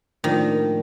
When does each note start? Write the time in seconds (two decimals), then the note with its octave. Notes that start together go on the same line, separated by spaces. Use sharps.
0.24 A2 D#3 F3 A#3 D4